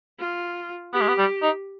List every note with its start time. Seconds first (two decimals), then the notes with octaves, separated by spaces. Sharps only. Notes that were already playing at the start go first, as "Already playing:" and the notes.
0.19 F4
0.93 B3 G4
1.01 G#3
1.08 B3
1.18 G3
1.43 D#4